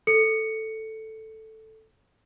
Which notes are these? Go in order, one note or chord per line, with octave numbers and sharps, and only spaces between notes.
A4 C#7